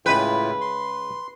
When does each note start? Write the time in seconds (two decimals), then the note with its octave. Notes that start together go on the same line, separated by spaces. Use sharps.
0.06 A2 C#3 G#3 E4 F4 B4 G5
0.61 C6